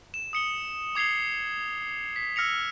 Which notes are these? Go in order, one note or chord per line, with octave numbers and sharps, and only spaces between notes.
E7
D#6 C#7 G7
D6 G#6 C7 F7 G7
B6
E6 F6 A#6 C#7 F7